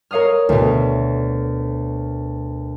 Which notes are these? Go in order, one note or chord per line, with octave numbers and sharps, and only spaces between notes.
A#4 C#5 F5 D#6 F6
D2 B2